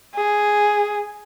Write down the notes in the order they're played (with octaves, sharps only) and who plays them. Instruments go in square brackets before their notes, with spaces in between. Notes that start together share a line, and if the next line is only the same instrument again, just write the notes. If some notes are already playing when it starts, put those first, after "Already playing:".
[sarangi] G#4